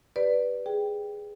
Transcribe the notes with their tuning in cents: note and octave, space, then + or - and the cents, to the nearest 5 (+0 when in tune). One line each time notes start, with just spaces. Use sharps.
G4 +0 B4 +0 D5 +0
G#4 +0 G5 +0